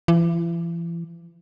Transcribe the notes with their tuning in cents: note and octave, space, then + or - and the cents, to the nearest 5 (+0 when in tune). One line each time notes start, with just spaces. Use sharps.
E3 +40